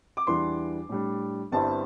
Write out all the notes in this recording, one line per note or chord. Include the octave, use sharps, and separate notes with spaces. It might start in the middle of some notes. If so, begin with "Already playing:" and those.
D6
E2 E3 G3 D4 C6
A2 G3 D4
G1 G2 G3 C4 E4 A5